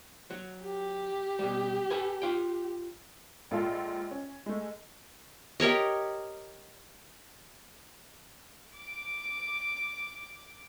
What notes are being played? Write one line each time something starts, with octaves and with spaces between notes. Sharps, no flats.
F#3
G4
B2 G3
A4 B4 G#5
F4 G5
A#1 G#3 F4 A4 C6
C#4
G#3 A3
G4 A#4 C#5 D#5
D6 D7